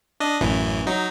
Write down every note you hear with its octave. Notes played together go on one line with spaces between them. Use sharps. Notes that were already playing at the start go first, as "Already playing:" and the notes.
D4 D#5
A1 F#2 E3
F#3 D#4